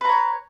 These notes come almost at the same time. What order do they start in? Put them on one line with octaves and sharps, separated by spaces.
B4 A#5 C#5